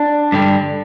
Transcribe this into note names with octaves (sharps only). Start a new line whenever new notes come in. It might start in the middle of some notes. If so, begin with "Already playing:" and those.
Already playing: D4
G2 D3 G3